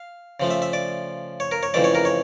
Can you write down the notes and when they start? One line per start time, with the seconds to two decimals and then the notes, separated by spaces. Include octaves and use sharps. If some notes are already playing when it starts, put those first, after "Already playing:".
Already playing: F5
0.40 C#3 F3 A3
0.50 E5
0.62 E5
0.73 D5
1.40 C#5
1.51 A#4
1.63 C#5
1.74 F2 C#3 E3 A3 D5
1.84 C#5
1.95 A#4
2.05 C#5